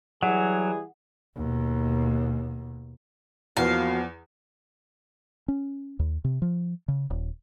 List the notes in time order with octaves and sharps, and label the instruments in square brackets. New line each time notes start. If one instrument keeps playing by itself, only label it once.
[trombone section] E3 G3 G#4 [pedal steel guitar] F#3 [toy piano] F#5
[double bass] D#2 B2
[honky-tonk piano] E2 [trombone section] F3 A#3 B3 [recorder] F#4 [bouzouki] F5
[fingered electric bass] C#4
D#2
C3
F3
C#3
D#1